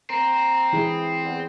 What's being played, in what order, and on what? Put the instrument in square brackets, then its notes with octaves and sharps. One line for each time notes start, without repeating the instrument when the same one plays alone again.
[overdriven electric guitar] C4 [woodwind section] A#5
[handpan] E3 E4 G#4
[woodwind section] E2